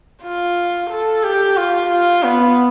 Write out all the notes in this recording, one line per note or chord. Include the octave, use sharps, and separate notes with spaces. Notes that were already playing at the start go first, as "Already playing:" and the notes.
F4
A4
G4
F4
F4
B3